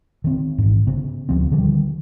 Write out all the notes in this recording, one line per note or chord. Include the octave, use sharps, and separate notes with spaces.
D#3 C4
A1 G#2
C#3 B3
D2 F3 C4
D3 D#3 F3 G3